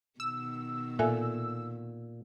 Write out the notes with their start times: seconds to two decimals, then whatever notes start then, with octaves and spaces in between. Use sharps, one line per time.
0.20 B2 D#3 E6
0.99 A#2 A4 E5 G#5